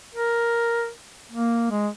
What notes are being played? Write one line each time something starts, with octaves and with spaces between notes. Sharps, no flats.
A#4
A#3
G#3